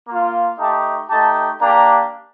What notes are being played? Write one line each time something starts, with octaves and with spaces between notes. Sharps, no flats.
A#3 F4
A3 D#4 G4 A5
A3 D#4 G4 A5
A#3 D4 G4 A#5